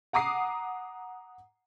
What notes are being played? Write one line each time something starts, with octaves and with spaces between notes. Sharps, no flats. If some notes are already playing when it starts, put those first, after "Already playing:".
F#5 A#5 D6 D#6 C7